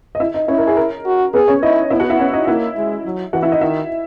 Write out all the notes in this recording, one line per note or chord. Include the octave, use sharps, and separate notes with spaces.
D#5
E4 E5
D#4 D#5
C#4 E4 C#5
A#4
G#4
A#4
F#4
B3 G#4 B4
C#4 C#5
D#4 E4 D#5
B3 E4 E5
F#4 F#5
E4 E5
C#4 C#5
D#4 D#5
A#3 E4 E5
G#3
F#3
E3 F#4 F#5
E4 E5
D#4 D#5
D#3 E4 E5